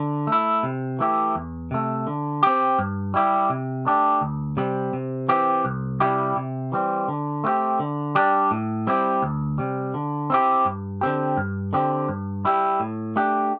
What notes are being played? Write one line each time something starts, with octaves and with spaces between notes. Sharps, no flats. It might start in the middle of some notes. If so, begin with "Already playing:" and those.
Already playing: D3
A3 E4
C3
E3 A3 E4 G4
E2
C3 A3
D3
C4 G4
G2
G3 E4 G4
C3
A3 D4 G4
D2
C3 G3 C4
C3
E3 C4 G4
C2
C3 G3 E4 G4
C3
E3 G3 C4
D3
A3 C4 E4 G4
D3
G3 D4 G4
A2
G3 C4 E4 G4
D2
C3 G3
D3
C4 E4 G4
G2
D3 C4 G4
G2
D3 C4 G4
G2
G3 E4 G4
A2
A3 D4 G4